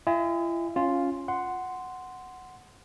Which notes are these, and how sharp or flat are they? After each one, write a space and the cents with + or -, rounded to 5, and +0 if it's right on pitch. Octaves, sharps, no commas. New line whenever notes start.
E4 +45 D#5 +35 G#5 -35
C#4 +0 F4 +0
F#5 +0 C6 -10